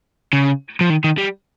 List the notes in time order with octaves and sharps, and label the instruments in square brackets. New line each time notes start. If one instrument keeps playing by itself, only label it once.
[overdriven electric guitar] C#3
F3
D#3
D#3
G3